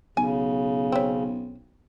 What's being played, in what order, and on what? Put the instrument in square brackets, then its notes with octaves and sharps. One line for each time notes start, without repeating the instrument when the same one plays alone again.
[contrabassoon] B1 [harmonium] C#3 [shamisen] G#5
[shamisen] C4 C#4